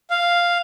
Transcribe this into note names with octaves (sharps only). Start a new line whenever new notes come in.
F5